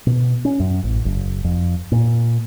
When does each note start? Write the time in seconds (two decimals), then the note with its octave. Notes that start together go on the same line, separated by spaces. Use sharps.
0.07 B2
0.45 C#4
0.60 F#2
0.84 A1
1.05 F#1
1.44 F2
1.92 A#2